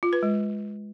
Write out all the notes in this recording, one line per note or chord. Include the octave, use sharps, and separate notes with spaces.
F4
B4
G#3